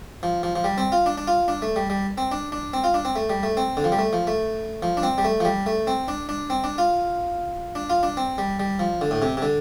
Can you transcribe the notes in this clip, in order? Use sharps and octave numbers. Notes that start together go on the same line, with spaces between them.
F3
F3
F3
G3
C4
F4
D4
D4
F4
D4
A3
G3
G3
C4
D4
D4
C4
F4
D4
C4
A3
G3
A3
C4
D3
F3
G3
A3
F3
A3
F3
D4
C4
G3
A3
F3
G3
A3
C4
D4
D4
C4
D4
F4
D4
F4
D4
C4
G3
G3
F3
D3
A2
C3
C3
D3